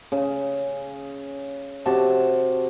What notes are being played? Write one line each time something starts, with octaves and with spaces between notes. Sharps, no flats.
C#3
C3 F#4 A5